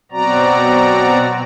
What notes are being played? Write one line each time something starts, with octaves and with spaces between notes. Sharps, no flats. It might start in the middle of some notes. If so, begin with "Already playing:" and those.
B2 F#3 C4 F#4 D5 A#5